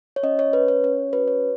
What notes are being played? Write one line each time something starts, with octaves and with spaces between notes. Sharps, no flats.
C#5
C#4 D#5
C#5
C#4 B4
C#5
C#4 C#5
F#4 B4
C#5